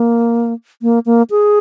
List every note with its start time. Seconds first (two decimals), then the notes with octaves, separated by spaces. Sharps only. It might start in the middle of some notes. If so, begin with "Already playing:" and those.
Already playing: A#3
0.82 A#3
1.06 A#3
1.30 G#4